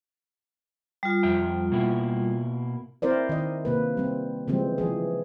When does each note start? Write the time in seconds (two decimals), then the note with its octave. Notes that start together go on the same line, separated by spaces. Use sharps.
1.03 G3 F4
1.23 F2 E5 G5
1.72 B2 A#3 E4
3.02 C4 E4 A#4 C5 D5
3.29 D#3 D#5
3.65 C3 A#3 B4
3.97 G3 C4
4.48 C#3 E3 F3 G3 G#3 C4
4.78 E3 F3 G#4